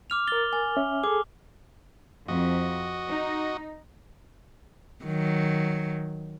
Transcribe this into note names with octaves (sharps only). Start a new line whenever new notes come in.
D6 F6 F7
A#4 A6 G7
G#5
C#4 E5
G#4 A4 D6
F2 F#4 D#5
D#4
D#3 F#3